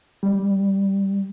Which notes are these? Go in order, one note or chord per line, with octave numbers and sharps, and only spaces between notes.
G3